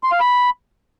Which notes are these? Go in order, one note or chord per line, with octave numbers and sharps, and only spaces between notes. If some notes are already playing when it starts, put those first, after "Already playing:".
C6
F5
B5